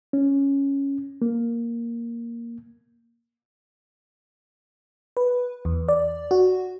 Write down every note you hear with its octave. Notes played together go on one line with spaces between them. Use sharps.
C#4
A#3
B4
E2
D5
F#4